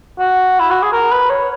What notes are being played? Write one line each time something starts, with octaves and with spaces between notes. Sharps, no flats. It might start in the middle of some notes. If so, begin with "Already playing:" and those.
F#4
E4
F#4
G#4
A#4
B4
C#5